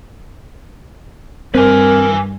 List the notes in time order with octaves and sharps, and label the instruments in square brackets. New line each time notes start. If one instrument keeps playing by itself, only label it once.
[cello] G2 [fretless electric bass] C4 [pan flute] A#4 [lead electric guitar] B4 G#5